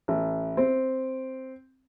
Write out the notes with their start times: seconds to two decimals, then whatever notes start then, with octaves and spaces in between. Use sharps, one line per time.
0.08 A1
0.57 C4